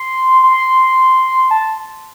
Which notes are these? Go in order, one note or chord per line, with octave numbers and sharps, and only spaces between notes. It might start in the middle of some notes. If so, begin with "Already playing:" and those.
Already playing: C6
C6
A5